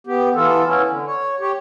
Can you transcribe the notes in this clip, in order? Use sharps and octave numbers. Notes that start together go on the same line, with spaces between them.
B3 G4
E3 B3 F4 A4
B3 C#4 E4
D3
C#5
G4 C#5